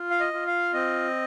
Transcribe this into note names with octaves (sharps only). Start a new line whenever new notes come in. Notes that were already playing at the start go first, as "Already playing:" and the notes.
Already playing: F4
F5
D#5
F4
F5
C4 D#5